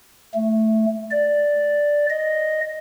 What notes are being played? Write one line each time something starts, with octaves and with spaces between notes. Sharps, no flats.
A3
D5
D#5